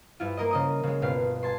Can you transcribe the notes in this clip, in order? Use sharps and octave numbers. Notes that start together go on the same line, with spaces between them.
G2 E4 F4
A#3 A#4 D#5
C#3 D#5 D#6
C#3 G#3
G1 B2 F5 C7
G#5 A5 C6